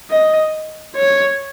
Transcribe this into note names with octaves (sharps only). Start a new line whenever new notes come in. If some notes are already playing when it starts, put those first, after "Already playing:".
D#5
C#5